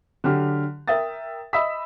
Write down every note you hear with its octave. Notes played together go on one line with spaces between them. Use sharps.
D3 F#3 G4 F6
A#4 E5 G5 D#6 A6
D#5 E5 B5 D#6 E6 B6